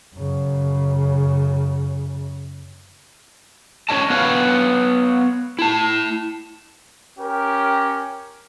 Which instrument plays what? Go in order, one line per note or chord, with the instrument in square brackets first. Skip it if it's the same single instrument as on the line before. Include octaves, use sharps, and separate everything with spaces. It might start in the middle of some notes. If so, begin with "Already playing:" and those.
[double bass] F#2 C#3
[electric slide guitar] C#4 D#4 C#5 D#5 A5
B3 B4 C#5 F5
E4 A5
[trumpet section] C#4 G4 A#4